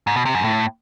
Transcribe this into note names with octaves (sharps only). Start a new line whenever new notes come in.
G#2
B2
C3
F#2
A2